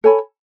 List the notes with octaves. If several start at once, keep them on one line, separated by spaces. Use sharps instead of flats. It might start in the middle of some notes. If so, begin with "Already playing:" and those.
A4 C#5 G#5 B5